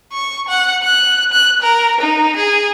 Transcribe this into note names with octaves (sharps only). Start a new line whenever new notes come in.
C#6
F#5
F#6
F#6
A#4
D#4
G#4